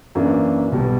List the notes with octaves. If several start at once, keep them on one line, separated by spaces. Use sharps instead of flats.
F#2 E3 A#3 D4
B1 B2 G3